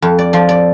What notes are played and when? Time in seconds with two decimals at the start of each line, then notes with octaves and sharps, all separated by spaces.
0.02 F2
0.19 D5
0.33 F3 D5
0.49 D5